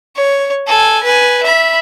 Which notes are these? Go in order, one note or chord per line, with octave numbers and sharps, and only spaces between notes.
C#5
A4 G#5
B4 G#5
E5 B5